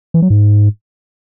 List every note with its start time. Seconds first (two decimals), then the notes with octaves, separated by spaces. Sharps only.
0.14 E3
0.22 F#3
0.30 G#2